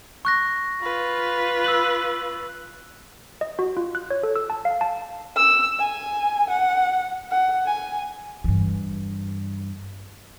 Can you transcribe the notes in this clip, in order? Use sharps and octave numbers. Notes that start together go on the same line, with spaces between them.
C#6 F#6 A#6
F4 B4
E6 F#6 F#7
D#5
F#4
F4
F#6
C#5
A4
E6
A5
F5
A5
E6
G#5
F#5
F#5
G#5
G2 E3